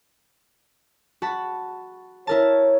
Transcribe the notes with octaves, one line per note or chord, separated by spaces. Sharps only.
F#4 A5 B5
E4 A#4 C#5 A5